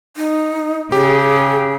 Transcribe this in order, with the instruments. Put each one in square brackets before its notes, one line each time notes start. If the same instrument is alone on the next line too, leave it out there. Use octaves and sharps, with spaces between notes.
[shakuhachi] D#4
[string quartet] C#3 [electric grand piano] G4 [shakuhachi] G#4